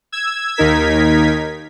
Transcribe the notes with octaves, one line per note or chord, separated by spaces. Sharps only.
E6 G#6
D#2 D#4 A#4 G#6 B6